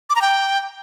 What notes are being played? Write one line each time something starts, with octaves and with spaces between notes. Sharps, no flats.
D6
A#5
G5